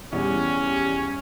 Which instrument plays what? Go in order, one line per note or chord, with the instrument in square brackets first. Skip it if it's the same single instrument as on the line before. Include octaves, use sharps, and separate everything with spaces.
[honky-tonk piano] E2 G3 [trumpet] C#4